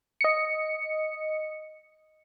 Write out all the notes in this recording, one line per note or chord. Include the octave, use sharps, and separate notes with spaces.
D#5 C#7